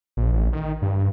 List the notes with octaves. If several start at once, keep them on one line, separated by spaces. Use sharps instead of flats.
A#1
A1
D#3
G2